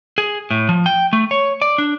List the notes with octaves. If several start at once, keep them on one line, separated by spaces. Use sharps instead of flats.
G#4
A2
F3
G5
A3
C#5
D5
D4